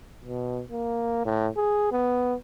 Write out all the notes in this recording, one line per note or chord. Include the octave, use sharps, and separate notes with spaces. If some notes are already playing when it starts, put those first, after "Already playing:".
B2
A#3
A2
G#4
B3